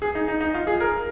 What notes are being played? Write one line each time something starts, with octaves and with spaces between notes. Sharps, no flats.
G#4
D#4
D#4
D#4
F4
G#4
A#4